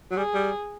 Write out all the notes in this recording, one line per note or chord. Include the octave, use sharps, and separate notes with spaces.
F#3
G3 G#4
G3